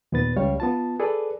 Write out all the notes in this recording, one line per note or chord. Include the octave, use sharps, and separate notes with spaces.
D#2 A#2 B3 B4 A6
C#2 G3 C#5 F5
B3 F4 A5
G#4 A4 B4 D5